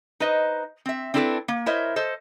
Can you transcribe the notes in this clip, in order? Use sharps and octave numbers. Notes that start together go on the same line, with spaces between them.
D#4 B4 C5 D#5
C4 E5
C4 D4 E4 G4 A4 B4
A#3
E4 A#4 C5 C#5 D#5 E5
A4 C5 D#5